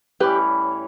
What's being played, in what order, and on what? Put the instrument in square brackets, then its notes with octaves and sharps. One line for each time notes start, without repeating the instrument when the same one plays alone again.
[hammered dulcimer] A2 E3 G3 C#4 [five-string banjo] G4 B4